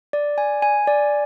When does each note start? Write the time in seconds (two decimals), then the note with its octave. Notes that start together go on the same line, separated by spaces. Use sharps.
0.13 D5
0.38 G#5
0.62 G#5
0.87 D5